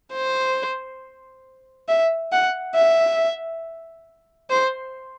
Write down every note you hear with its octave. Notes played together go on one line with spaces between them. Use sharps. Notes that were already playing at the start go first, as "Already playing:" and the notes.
C5
E5
F#5
E5
C5